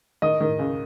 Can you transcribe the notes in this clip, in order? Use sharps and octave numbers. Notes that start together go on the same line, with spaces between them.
D#3 D#5
D#3
C#2